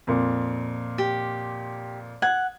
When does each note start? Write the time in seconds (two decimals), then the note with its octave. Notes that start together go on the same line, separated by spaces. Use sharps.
0.07 F2 A#2
0.98 G4
2.22 F#5 G#6